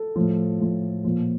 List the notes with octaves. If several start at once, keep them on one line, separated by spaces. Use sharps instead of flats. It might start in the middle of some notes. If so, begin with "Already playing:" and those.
Already playing: A4
A2 F3
A2 F3
A#2 F3